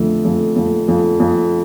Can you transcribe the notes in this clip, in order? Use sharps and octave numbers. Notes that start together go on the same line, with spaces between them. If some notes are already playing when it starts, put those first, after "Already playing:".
Already playing: F2 D3 A3
F2
F2
F2
F2